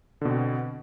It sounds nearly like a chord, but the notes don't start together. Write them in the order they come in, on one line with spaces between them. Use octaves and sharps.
D3 B2 C4